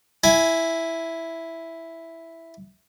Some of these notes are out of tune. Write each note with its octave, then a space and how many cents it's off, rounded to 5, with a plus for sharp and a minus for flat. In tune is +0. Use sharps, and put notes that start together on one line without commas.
E4 +0 G#5 +5